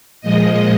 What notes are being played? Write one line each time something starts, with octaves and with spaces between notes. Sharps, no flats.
A#2 F3 G#3 D#5